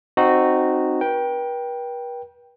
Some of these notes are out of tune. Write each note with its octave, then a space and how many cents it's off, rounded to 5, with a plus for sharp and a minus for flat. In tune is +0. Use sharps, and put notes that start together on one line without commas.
C4 +0 D#4 -15 F#4 -5
B4 -45 G5 +0